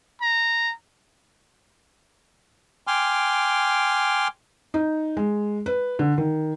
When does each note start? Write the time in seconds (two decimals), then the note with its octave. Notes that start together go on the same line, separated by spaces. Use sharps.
0.21 A#5
2.87 G5 G#5 C6 D6 F6
4.74 D#4
5.17 G#3
5.66 B4
5.99 D3
6.18 D#3